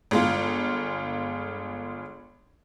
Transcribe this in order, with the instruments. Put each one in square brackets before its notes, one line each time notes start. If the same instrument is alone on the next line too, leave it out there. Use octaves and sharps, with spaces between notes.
[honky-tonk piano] G1 G#3 F4